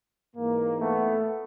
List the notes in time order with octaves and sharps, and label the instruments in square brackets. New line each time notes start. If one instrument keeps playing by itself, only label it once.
[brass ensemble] G#2 E3 A#3
A3 B3